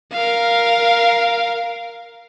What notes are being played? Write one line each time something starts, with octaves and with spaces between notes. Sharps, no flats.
A#4 F5